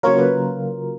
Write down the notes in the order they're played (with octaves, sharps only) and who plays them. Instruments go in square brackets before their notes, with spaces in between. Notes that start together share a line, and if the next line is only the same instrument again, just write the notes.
[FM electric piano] C#3 F#3 A#3 F4 A#4 [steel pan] C#5
[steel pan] B4